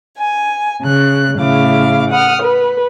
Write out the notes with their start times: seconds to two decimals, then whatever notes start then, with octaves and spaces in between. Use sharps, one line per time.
0.17 G#5
0.83 C#3 F#6
1.39 A2 C#3 E4 F5 D6
2.10 F#5 D#6 F6
2.41 B4